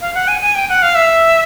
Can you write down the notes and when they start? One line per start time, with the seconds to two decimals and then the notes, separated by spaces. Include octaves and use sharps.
0.01 F5
0.15 F#5
0.28 G#5
0.42 G#5
0.55 G5
0.69 F#5
0.82 F5
0.95 E5